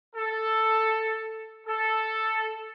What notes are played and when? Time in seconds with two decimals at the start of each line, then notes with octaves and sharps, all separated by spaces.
0.16 A4
1.67 A4